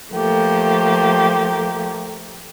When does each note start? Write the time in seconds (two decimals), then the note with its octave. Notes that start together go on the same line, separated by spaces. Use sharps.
0.11 F3 A3 A#3 G4